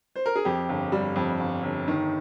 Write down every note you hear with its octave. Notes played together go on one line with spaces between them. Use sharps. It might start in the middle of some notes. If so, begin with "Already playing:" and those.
C5
A#4
G#4
F2 G4
G1
G3
F2
G1
G1
D#3